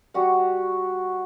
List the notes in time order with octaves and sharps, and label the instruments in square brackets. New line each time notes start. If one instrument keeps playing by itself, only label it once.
[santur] G3 F#4 F#5